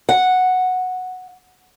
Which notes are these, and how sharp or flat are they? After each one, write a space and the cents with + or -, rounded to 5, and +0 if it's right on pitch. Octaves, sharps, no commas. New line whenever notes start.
F#5 -5